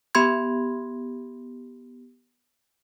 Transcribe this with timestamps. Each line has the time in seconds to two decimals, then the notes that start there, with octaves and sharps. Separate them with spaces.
0.15 B3 G4 B5 C6 G#6